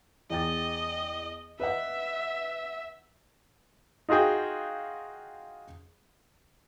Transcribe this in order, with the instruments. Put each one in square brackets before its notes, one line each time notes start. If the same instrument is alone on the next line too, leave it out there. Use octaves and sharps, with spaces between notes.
[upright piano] E2 G5 A6 [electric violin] D#5
[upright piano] B4 D#5 F#5 [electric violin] E5
[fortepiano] D#4 F4 F#4 G#4 G5